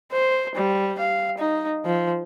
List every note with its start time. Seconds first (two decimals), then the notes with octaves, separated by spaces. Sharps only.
0.12 C5
0.55 G3
0.98 F5
1.38 D#4
1.85 F3